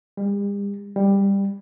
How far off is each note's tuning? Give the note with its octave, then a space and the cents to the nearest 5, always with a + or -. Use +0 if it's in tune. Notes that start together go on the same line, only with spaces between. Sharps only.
G3 +45
G3 +15